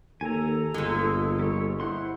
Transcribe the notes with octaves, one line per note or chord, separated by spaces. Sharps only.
D#2 A4 G#5 A#5
G1 A#2 G#3
G3 C#5
E4 C5 F#5 C6